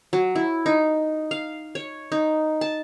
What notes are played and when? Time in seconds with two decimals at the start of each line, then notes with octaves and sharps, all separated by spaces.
0.13 F#3
0.35 E4
0.66 D#4
1.31 F5
1.75 C#5
2.12 D#4
2.61 A5